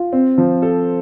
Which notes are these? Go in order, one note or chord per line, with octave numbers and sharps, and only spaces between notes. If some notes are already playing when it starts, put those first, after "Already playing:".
Already playing: F4
C4
F3
A4